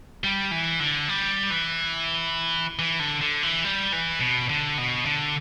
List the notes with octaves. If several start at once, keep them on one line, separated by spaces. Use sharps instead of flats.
G3
E3
D3
G3
E3
E3
D3
D3
E3
G3
E3
B2
D3
B2
D3